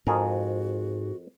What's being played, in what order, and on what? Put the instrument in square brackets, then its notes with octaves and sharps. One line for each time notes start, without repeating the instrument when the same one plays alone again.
[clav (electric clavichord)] F2 G#4 A#4 [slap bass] G#2 [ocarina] F#4